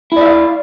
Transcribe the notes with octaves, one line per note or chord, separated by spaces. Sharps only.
E4 D5 E5 F5